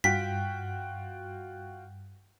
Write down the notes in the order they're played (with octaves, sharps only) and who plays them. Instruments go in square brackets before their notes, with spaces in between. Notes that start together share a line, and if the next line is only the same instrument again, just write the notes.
[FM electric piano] G2 [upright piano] F4 F#4 G5 [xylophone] B6